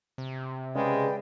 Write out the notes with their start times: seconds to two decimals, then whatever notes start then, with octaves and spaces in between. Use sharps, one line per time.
0.18 C3
0.75 C#3 G#3 B4 D5 G5